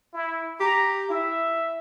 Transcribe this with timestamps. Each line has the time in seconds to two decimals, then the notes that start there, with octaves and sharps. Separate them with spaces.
0.14 E4
0.60 G4 A#5
1.10 E4 E5